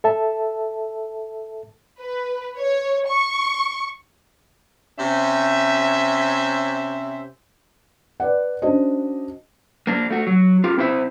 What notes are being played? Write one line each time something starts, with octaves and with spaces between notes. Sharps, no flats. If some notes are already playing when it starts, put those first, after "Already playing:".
A4 E5 A5
B4
C#5
C#6
C3 C#4 C5 E5
B4 D5 F#5
C#4 D4 F#4 C5 D#5
A#3 D4
A3 F#4
F#3
F4 G4 A#4
C4 E4 C5 E5